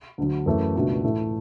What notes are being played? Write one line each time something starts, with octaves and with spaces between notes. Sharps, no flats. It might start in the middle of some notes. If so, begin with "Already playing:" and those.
D2 D3 F#3
F#2 E3 A3 E4
C#2 B2 A3 D4 F#4
A2 E3 A3 E4